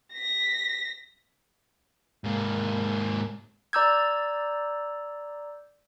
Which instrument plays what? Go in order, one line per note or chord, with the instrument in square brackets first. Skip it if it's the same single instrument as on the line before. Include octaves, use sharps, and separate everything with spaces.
[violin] A#6 B6
[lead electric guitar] G#2 A#3
[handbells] D5 A#5 D6 E6 G6 G#6